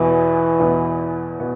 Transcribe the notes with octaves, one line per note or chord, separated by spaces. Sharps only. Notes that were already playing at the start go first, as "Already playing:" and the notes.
Already playing: E2 B2 E3 B3
E2 B2 B3
B2 B3